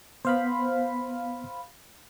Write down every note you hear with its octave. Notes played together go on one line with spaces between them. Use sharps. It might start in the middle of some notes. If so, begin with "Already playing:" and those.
B3 C5 F5 B5